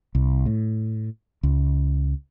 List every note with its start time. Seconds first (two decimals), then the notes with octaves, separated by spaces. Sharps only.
0.15 C2
0.46 A2
1.43 C#2